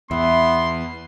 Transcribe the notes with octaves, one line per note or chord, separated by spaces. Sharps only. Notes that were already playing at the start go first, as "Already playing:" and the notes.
E2 B3 E4 C6